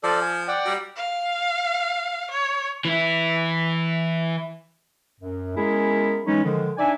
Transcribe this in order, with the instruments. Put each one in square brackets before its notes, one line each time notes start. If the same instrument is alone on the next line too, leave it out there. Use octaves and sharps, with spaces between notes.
[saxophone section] F3 [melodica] A4 D5
[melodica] G#5
D5 F#5 G5
[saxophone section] F#3 G3
[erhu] F5
C#5
[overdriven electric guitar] E3 E4
[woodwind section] F#2
G#3 B3 C#4 E4 G#4 A#4
E3 F#3 G#3 C#4 D#4
D3 D#3 F3 G#3
D4 D#4 D5 E5 G#5